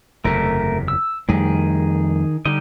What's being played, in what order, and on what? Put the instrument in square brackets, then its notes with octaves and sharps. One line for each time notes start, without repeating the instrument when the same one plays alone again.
[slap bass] F#1 E2 C3 [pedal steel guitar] A3 A#4
[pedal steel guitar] E6
[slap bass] F2 G3 A3 [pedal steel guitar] D#3 G#4
[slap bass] D3 [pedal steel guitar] G3 D#4 D#5